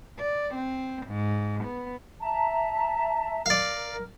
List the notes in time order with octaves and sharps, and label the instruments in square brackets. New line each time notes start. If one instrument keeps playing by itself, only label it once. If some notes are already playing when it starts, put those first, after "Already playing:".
[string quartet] D5
C4
G#2
B3
[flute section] E5 A5 A#5
[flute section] A#4 [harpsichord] D5 F5